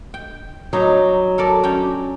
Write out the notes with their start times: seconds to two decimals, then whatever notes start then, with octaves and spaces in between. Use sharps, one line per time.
0.14 G5
0.73 F#3 G3 D#4
1.38 A4 A#4 D5
1.63 C#4 D5 G5